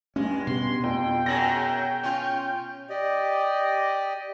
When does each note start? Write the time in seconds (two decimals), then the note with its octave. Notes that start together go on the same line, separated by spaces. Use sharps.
0.16 G2 G#3 C#4
0.47 B2 C6
0.84 F2 G5
1.26 F#2 F#3 G#4 A#6 F#7
2.03 C#4 F4
2.90 G4 D5 D#5